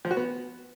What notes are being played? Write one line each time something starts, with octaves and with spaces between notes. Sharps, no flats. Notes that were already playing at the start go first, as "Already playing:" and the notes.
F3
F#4
B3